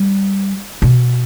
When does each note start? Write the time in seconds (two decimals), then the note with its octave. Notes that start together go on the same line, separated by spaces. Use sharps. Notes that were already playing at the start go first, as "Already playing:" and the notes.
Already playing: G3
0.82 B2